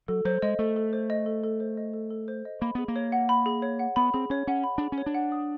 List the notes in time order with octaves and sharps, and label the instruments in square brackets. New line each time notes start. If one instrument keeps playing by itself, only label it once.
[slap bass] F#3 [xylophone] A4
[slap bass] F#3 [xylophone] C5
[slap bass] G#3 [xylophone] D#5
[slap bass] A3 [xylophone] A4
[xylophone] A4
C5
D#5
A4
A4
C5
D#5
A4
A4
C5
D#5
[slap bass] A#3 [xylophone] B5
[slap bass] B3 [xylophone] G#4
[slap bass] A#3
[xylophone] C#5
F#5
B5
G#4
C#5
F#5
[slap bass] B3 [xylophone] B5
[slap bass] C4 [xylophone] G#4
[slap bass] C#4 [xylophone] C#5
[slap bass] C#4 [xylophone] F#5
[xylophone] B5
[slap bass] D4 [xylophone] G#4
[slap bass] C#4
[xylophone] C#5
[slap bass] D4
[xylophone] F#5
D#6